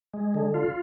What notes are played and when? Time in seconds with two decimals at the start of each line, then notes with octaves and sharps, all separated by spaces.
0.14 G#3
0.34 D3
0.54 F4